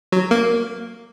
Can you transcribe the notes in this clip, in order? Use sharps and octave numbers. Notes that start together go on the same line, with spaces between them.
F#3
A#3